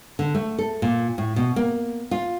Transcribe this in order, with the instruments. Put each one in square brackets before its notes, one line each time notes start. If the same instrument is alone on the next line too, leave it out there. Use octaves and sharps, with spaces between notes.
[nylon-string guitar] D3
A3
A4
A#2
A2
B2
A#3
F4